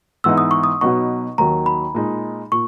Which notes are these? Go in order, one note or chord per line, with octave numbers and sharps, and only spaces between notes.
G#2 E3 B3 D#4 E6
D#6
C#6
D#6
B2 F#3 B3 D#4 C#6
D#2 D#3 F#3 A#5
B5
A#2 G#3 D#4
A#2 C#6